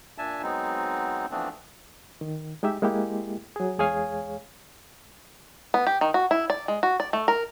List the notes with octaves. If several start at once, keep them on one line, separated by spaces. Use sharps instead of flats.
A#2 D4 E5 G#5 A5
F#3 G#3 B3 C4 D#4
E3 F3 A3 B3 C4 D4
D#3
G#3 D#4 G4 E5
G#3 A#3 E4 G4
F#3 G#4
E2 G#3 G#4 C#5 F5 G#5
B3
G4
D#3
F#4
E4
D5
G#3
F#4
D5
A3
A#4